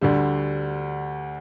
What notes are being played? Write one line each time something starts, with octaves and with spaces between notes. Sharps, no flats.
D2 D3 G3